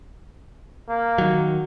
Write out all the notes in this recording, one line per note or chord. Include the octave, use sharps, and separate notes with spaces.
A#3
D#3 F#3